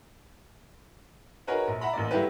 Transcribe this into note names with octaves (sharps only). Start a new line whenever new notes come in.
D#4 F#4 G#4 A#4 B4 C#5
A#1
E5 F#5 A#5 B5
A1 A#3 D5
F#3 A3 E4 G4 B4